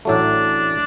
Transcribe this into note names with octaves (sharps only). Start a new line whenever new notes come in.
A1 A2 F#3 A3 D4